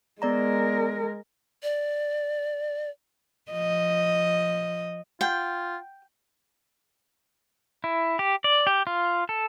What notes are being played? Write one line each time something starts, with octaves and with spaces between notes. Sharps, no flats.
G#3 B3 A#4 D5 A#5
D5
F3 D#5
F4 F#5 G5 G6
E4
G4
D5
G4
F4
A4